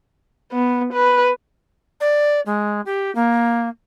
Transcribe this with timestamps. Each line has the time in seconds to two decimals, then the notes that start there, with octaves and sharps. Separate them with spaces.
0.53 B3
0.93 B4
2.01 D5
2.46 G#3
2.86 G4
3.15 A#3